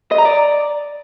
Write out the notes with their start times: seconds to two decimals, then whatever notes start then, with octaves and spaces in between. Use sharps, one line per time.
0.11 D#5
0.18 A#5
0.25 D5